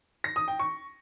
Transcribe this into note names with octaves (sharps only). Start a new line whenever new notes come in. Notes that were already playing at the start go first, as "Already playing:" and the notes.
A#6
D#6
G5
C#6